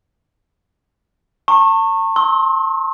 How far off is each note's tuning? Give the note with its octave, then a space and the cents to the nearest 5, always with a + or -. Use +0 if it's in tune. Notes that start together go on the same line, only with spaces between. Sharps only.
A5 +40 C#6 -25
C6 +30 E6 -35